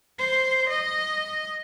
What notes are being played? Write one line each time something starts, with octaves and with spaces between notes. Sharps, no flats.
C5
D#5